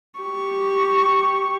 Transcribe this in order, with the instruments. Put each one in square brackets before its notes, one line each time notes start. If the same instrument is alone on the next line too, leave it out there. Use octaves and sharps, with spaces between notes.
[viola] G4 C#6